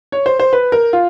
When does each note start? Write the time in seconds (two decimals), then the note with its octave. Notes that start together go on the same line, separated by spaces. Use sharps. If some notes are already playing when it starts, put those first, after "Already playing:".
0.12 C#5
0.26 C5
0.40 C5
0.53 B4
0.72 A#4
0.93 F4